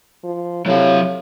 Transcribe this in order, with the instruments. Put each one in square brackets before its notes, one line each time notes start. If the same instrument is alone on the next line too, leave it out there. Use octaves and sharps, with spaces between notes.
[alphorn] F3
[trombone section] C3 E4 A4 [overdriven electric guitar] F#3 F5 [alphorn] C#5